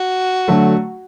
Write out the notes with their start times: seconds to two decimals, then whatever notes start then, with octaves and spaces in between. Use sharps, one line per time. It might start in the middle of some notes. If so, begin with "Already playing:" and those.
Already playing: F#4
0.48 D3 F#3 A3